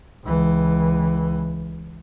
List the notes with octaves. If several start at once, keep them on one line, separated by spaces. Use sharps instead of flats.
C#2 E3